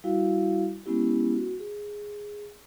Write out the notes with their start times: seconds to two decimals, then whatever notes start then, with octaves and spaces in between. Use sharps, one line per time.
0.04 G3 E4 F#4 F5
0.86 G#3 B3 C#4 E4 G4
1.35 F#4
1.60 G#4